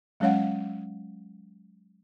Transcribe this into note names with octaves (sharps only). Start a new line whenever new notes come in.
F#3 G#3 C#4 C#5 F5 F#5